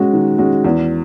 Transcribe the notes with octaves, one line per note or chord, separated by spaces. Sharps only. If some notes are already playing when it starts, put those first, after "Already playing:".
Already playing: G#3 C#4 F#4
D#3
G#3 C#4 F#4
E2